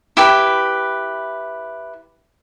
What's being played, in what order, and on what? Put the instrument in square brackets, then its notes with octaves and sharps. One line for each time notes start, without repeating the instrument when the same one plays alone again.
[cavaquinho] E4 G4 B4